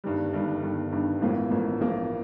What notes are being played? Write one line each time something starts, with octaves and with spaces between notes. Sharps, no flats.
G1 G2 D#3 G3
G1 G2 D#3 G3
G1 G2 D#3 G3
G1 G2 D#3 G3
A1 A2 F3 A#3
A1 A2 F3 A#3
A1 A2 F3 A#3